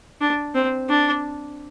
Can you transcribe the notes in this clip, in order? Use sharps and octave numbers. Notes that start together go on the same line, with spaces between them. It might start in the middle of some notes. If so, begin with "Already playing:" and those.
D4
C4
D4